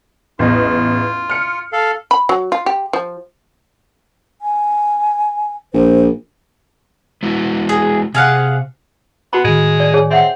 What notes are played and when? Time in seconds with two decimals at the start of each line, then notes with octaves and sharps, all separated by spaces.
0.39 A1 E2 F4 D#5
1.30 F6 C#7
1.72 A4 F5
2.11 B5
2.29 F#3
2.52 F4
2.66 G4
2.93 F3
4.41 G#5
5.74 A#1 C5
7.23 G#3 E4 F#4
7.69 G#4
8.15 C3 G#4 F5 F#5
9.33 B3 F#4 B5
9.44 A2 D#3 G#3
9.80 D5
9.94 G#4 C#5 G#5
10.11 C4 D#5 E5 F#5